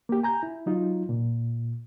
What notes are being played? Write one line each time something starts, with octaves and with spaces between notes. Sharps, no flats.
A#3 G4
G#5 A#5 G6
E4
F#3 D#4 F4
A#2